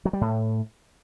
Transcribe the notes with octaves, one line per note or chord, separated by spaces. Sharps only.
F#3
G3
A2